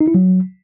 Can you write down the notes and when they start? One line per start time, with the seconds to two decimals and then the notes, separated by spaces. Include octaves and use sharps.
0.01 D#4
0.08 E4
0.15 F#3